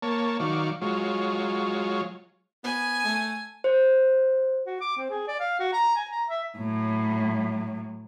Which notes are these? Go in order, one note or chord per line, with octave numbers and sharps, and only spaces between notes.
A#3 C#5 A5
D#3 F#3 D5 F5 C#6
F#3 G#3 F4 C#5
B3 G#5
A3
C5
F#4
D6
C4
G#4
D5
F5
F#4
A#5
G#5
A#5
E5
A2 F#3